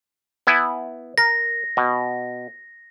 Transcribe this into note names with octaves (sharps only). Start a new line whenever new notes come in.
B3 E4 G#5
A#4 A#6
B2